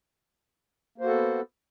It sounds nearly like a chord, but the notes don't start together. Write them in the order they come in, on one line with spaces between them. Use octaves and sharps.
A#3 C5 F#4 A4 B3